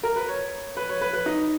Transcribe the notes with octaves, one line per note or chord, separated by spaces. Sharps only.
A#4
B4
C#5
B4
C#5
B4
B4
D#4